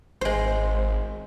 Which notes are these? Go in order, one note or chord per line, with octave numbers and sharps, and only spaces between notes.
G#1 G#3 C5